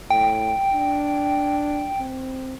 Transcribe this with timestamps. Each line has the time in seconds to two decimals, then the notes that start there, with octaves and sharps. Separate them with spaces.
0.10 A2 G5
0.73 D4
2.00 C4